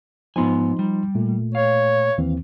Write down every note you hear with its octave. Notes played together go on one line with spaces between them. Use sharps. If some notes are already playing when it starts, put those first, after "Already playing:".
G#2 F3 B3 D#4 G#5 C6
G3
A#2 A3
C#5 F5
D#2 E3 C4